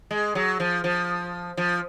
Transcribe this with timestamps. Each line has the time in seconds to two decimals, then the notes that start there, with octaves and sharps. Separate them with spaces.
0.11 G#3
0.35 F#3
0.60 F3
0.84 F3
1.57 F3